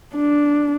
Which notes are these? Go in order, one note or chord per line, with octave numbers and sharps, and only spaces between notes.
D4